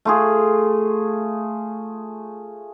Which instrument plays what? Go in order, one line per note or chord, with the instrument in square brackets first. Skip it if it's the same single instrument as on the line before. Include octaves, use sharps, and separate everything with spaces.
[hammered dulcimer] A3 F4 G#4